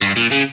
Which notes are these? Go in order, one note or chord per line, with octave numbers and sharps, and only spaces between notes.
G2
A#2
C#3